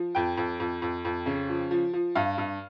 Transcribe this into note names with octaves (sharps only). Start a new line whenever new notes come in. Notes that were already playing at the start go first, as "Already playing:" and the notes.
Already playing: F3
F2 G5
F2
F2
F2
F2
C#3
F3
F3
F3
G2 F5
G2